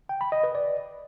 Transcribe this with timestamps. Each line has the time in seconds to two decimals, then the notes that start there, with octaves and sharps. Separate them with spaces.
0.09 G5
0.21 B5
0.32 D#5
0.43 B4
0.55 D5